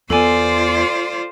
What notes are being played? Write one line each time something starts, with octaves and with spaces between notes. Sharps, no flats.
E2 B3 F4 A4 C5 D5 G#5